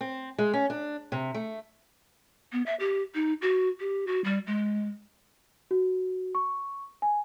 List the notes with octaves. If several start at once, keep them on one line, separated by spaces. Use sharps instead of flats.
C4
G#3
C#4
D4
C3
A3
B3
E5
G4
D#4
F#4
G4
F#4
G3
G#3
F#4
C#6
G#5